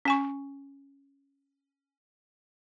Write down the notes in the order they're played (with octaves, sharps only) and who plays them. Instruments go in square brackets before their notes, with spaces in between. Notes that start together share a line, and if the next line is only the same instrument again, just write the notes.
[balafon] C#4 G#5 C#6